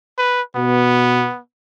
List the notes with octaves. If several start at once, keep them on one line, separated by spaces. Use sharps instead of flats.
B4
B2 B3